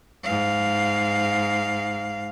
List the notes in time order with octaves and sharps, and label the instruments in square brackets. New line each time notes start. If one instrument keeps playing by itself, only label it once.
[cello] G#2 F5